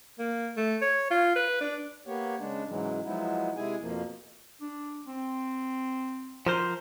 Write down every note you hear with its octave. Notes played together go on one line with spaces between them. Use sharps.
A#3
A3
C#5
F4
B4
D4
A#3 B3 G4 C#5
C#3 G#3 D4
G#2 C#3 E3 F#3 G#3
F3 F#3 G#3 B3 D#4 E4
C3 G#3 E4 G#4 G#5
F2 B2 F3 A#3
D4
C4
F3 A#4 C5